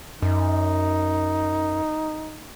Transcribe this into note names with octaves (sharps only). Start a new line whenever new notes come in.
F#2 D#4